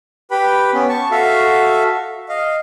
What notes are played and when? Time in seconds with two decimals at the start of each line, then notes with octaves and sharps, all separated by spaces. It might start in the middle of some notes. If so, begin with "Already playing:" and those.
0.31 G4 B4 G5 B5
0.74 B3 C#4
0.89 A5 C#6
1.11 F#4 A4 E5 F5
2.29 D#5 F5